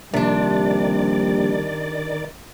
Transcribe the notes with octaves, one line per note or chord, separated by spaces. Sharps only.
A#1 C3 D#3 G3 D4 D5